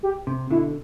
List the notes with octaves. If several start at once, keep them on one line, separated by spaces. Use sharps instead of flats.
G4
C3
B2 D3 E4